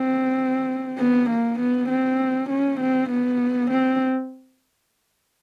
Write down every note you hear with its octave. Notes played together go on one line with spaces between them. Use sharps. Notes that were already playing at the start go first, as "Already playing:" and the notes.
Already playing: C4
B3
A#3
B3
C4
C#4
C4
B3
C4